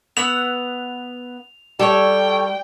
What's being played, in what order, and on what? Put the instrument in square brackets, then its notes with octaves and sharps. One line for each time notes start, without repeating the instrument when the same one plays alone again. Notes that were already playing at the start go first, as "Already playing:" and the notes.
[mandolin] B3 F#5 E6 [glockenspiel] F7
[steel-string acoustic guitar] G3 [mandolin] A4 C#5 [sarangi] G5